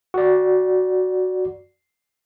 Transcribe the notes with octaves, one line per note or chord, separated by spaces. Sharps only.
F#4 D5